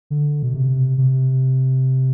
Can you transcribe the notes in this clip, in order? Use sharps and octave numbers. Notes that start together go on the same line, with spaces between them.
D3
B2
C3
C3